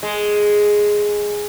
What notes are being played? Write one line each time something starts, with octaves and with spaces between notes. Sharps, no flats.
G#3